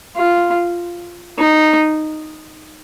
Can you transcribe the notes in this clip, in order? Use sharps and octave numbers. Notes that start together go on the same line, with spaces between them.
F4
D#4